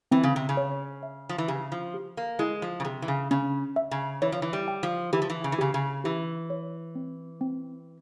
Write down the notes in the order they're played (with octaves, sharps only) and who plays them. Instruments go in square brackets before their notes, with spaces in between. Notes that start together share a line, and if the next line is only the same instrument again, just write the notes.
[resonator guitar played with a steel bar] E3 [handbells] C4
[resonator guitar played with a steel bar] C#3
C3
C#3
[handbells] C#5
E5
[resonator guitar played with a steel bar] F3
E3
[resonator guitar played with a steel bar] C#3 [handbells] G4
[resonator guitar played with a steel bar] F3
[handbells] G4
[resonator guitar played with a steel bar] A#3
[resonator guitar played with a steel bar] G#3 [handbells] E4
[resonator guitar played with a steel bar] F3
C#3
[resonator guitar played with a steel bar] C3 [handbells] G#4
[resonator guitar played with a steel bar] E3
C#3
[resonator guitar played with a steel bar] C#3 [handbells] C#4
[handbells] E5
[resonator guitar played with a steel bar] C#3
[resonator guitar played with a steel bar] E3 [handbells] C#5
[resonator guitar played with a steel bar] F3
E3
G3
[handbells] G5
[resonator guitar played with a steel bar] F3
[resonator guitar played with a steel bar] E3 [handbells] G4
[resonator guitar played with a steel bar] F3
E3
C#3
E3
[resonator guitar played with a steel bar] C#3 [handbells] G4
[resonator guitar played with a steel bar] C#3
[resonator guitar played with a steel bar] E3 [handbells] G4
[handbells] C#5
C4
C4